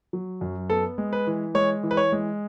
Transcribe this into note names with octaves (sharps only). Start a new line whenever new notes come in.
F#3
F#2
B3 A4
G#3
B4
E3
G#3 C#5
E3
B4
C#5
G#3